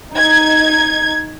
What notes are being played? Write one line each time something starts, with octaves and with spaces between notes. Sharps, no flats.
D#4 G#6